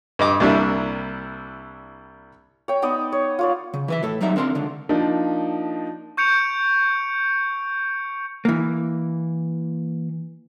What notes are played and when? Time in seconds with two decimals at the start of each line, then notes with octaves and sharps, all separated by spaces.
0.19 G2 D#5 D6
0.40 C2 G3 A#3 D4 E4
2.68 C#5 G5
2.82 B3 D#4 D5 D#5
3.12 C#5
3.39 F4 C#5 D5
3.74 C#3
3.88 E3 B4 E5
4.03 A2 A4
4.21 F2 F#3 G3 D#4 E5
4.36 D3 C4 A#4 G#5 C6
4.55 C#2 D3
4.89 F3 A#3 D4 D#4
6.17 C#6 G6 C#7 D7 F7
8.45 E3 A#3